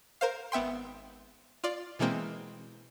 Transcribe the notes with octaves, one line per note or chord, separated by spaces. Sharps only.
A#4 C5 F5
G#1 B3 E5 G5 C6
F4 D5
B2 E3 G#3 A#3 C4